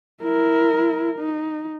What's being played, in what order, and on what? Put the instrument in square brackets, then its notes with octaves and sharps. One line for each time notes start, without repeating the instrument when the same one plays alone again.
[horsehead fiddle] E4 A#4
D#4